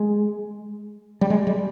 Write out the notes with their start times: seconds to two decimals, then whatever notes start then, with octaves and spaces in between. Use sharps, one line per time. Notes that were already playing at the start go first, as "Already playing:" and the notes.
Already playing: G#3
1.21 G3
1.30 G#3
1.47 G3